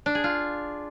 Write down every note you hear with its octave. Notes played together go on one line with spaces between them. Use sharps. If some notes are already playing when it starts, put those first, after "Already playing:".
D4
G#4
F4